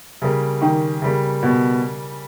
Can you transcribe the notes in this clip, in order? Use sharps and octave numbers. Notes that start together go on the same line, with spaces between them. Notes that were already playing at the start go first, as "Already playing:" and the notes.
C#3 G3 A#3
D#3
C#3 G3 A#3
B2